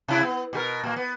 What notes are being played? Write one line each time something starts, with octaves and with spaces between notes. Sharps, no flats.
C3 E4
B3
B2 G4 A#4
A#2 A#3
B3